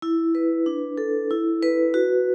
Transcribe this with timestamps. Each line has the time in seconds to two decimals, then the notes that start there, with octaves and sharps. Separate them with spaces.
0.02 E4
0.35 B4
0.66 D4
0.98 A4
1.31 E4
1.63 B4
1.94 F#4